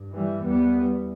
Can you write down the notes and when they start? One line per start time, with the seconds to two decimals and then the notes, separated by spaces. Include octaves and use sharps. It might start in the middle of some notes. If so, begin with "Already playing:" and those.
Already playing: G2
0.13 E3 G3
0.44 E2 G3 B3